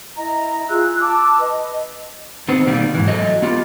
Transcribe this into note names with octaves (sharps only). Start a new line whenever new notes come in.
E4 D#5 A#5
F4 G#4 E6 F#6
A5 D6 E6
B4 D#5
D#3 B3 C4
B2 D#3 G3 A#3
G#2 E3
F#3 A3 D#5
B3 F4 G4